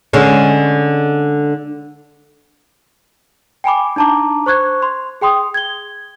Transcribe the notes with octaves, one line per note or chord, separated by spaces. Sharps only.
D3 G#3 C#4
G5 G#5 B5 D6
D4 D#4 A5 A#5 D6
C5 C#6 F#6 G#6
C6
G#4 G5 C6 D#6
G#6 G7